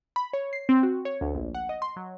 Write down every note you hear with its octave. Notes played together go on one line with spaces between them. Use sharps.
B5
C#5
C7
C4
F#4
C#5
D2
A#1
F#5
D#5
C6
F#3